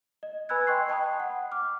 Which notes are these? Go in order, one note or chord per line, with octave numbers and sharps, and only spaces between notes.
D#5
B4 G#5 B5 E6 F#6 G#6
D#5 G5 C6 C#6 F#6 C7
D#5 G5 A5 B5 D#6
F#5
D6 F6